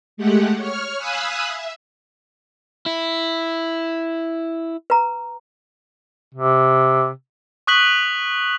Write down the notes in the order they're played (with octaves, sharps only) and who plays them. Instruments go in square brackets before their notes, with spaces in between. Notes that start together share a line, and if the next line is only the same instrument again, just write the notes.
[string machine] G#3 A3 G4 F#5
C#5 C#6 F6
F5 G#5 B5 D#6 E6 F#6
E5
[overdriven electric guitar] E4
[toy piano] B4 A#5
[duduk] C3
[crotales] C#6 D#6 F#6 B6 F#7